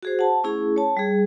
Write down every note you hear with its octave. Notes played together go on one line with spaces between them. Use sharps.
F#4 G#4 C5
F#5 A5
A3 C#4 E4 G#4
C#5 A5
G3 G#4